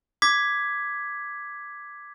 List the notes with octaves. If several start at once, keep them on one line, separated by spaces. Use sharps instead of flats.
D6 G#6 B6